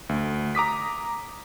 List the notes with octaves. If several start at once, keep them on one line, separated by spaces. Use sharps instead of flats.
D2
A#5 D6 D#6 B6